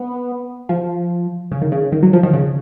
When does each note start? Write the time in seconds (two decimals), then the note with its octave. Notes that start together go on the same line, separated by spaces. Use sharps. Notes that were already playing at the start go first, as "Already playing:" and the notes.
Already playing: B3
0.69 F3
1.52 C#3
1.61 D#3
1.72 C#3
1.92 D#3
2.03 F#3
2.13 F3
2.23 D#3
2.33 C#3